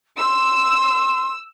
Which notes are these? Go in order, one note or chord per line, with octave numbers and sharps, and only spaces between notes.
C6 E6